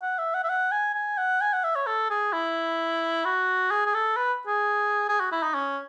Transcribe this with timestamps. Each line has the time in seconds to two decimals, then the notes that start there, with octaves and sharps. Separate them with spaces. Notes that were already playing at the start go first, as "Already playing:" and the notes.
0.02 F#5
0.18 E5
0.34 F#5
0.44 E5
0.49 F#5
0.72 G#5
0.94 G#5
1.18 F#5
1.41 G#5
1.53 F#5
1.64 E5
1.76 C#5
1.87 A4
2.10 G#4
2.33 E4
3.25 F#4
3.71 G#4
3.86 G#4
3.94 A4
4.17 B4
4.47 G#4
5.09 G#4
5.20 F#4
5.32 E4
5.43 D#4
5.54 C#4